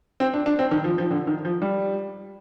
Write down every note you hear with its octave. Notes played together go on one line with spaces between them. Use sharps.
C4
D4
D4
C4
D#3
F3
F3
D3
D#3
F3
G3